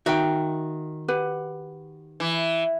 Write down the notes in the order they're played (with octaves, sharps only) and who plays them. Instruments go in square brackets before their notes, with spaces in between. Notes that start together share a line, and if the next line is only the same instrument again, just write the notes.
[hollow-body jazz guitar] D#3 F#4 [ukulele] E5 G5
[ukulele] G4 B4 F#5
[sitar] E3